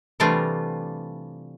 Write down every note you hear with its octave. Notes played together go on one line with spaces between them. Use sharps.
C3 E3 G3 A3 D4 F4